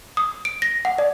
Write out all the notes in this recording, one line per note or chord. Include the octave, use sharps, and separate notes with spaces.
D#6
D7
A#6
F#5
D5